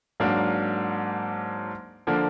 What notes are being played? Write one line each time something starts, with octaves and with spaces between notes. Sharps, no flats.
G#2 F#3 A#3 D4
D3 F3 A#3 D4